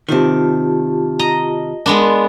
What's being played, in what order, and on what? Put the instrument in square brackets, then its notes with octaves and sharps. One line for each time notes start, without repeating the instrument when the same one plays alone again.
[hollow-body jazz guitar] C3 D#3 [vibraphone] F4 G4 A5
[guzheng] D#5 A#5
[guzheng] G#3 B3 D4 [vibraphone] A#4 C6